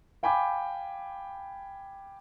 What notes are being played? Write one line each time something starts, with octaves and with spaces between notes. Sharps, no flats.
F5 G5 G#5 B5 D6